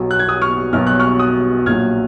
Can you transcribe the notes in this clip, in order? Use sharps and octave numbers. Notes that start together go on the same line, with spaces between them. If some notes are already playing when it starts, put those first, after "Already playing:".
Already playing: B1 B2 F#3
F#6
G#6
D#6 F#6
C#6 F6
B1 B2 F#3 F6
F#6
C#6 F6
D#6 F#6
A#1 A#2 F#3 F6 G#6